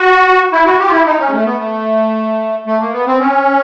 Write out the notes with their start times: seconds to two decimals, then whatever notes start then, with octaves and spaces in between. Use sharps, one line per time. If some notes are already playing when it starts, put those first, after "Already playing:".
Already playing: F#4
0.52 E4
0.65 F#4
0.79 G4
0.86 F4
0.91 E4
1.06 D#4
1.19 C#4
1.27 G#3
1.32 A3
1.46 B3
1.59 A3
2.66 A3
2.80 A#3
2.93 B3
3.07 C4
3.20 C#4